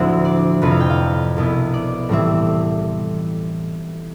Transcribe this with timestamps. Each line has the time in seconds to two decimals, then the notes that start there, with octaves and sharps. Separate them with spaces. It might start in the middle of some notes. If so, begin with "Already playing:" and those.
Already playing: D2 A2 D3 F3 C4 E4 C5 E5
0.25 D5
0.62 F2 C3 F3 C4 B4
0.71 F5
0.80 G5
0.90 F5
1.37 C2 B2 B3 E4
1.74 D5
2.09 A2 E3 G3 C4 E5